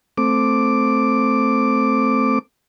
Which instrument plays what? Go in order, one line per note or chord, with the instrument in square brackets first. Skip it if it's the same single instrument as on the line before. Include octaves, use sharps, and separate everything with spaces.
[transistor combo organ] A3 C4 D6